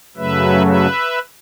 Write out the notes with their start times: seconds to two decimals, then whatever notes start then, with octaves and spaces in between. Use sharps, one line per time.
0.17 F#2 C#3 F#3 A3 B4 E5
0.66 B4 E5